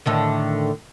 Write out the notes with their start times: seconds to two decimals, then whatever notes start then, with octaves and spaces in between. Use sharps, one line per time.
0.06 A2 D3 D#3